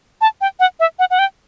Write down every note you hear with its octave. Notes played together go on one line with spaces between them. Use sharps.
A5
G5
F#5
E5
F#5
F#5
G5